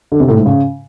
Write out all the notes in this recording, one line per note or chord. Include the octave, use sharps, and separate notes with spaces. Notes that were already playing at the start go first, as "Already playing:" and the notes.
D3
C3
A2
G#2
C#3